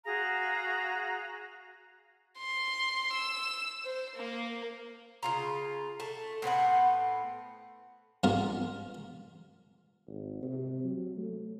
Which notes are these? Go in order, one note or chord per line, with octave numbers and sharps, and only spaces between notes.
F#4 G#4 F5 A#5
C6
E6
C5
A#3
C#3 F4 A#5
A3 A5
A2 B3 C4 F#5
G2 B3 F4 A#4
G#1
C3
F#3
A3